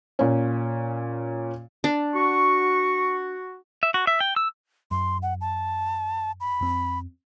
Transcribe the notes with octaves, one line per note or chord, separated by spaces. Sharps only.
A#2 C#4
D4
F#4 C#6
E5
F#4
E5
G5
E6
F#2 C6
F#5
A5
B5
F2 C4